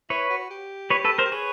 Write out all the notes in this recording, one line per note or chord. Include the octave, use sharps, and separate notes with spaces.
E4 B4 C#5
F#4
G4
B4 C#5
A4 B4
A#4 C5
G4
G#4 B4 C#5